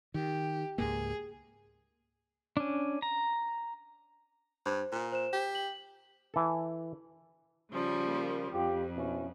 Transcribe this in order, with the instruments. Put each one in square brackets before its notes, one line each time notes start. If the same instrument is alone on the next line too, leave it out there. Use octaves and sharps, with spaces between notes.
[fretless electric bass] D#3 [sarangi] G4
[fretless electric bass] C#2 G#2 A#3 [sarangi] G#4
[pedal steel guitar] C#4 D4
A#5
[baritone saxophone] G2 [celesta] C5
[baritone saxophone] A#2
[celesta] C5 E7
[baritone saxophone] G4
[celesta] F#7
[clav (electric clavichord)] E3 A4
[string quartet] C#3 F3 G3
[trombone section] A#3
[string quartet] F2 [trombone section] F4 G4
[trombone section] B2 C#4 E4